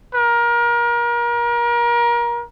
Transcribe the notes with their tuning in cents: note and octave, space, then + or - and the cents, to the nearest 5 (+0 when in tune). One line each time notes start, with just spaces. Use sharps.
A#4 +30